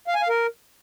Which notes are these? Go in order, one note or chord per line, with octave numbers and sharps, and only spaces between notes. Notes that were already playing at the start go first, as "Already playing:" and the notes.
F5
G#5
F5
A#4